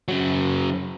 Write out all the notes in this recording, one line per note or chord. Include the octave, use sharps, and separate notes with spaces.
C#3 F#3